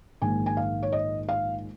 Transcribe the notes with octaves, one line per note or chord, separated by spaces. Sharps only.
A#1 G#2 D#3 G#5
G#5
F5
C#5
D#5
F5